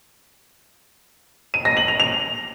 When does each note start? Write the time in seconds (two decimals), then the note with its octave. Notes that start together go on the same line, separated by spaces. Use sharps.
1.54 D#7
1.65 A#6
1.77 F#7
1.88 F7
2.00 F7